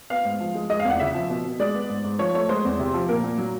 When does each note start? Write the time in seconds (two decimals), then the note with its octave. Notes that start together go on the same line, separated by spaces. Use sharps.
0.10 B3 F5
0.25 G#2
0.40 F3
0.55 G#3
0.69 G#3 D#5
0.80 F5
0.85 E2
0.90 F#5
1.00 C#3 E5
1.15 F3
1.30 B2
1.45 B2
1.59 G#3 D5
1.75 B3
1.89 G#2
2.04 G#2
2.19 F3 C#5
2.34 A3 C#5
2.49 G#3 C5
2.65 E2
2.79 C3
2.94 F3
3.09 A#2 A#4
3.24 A#2
3.38 F#3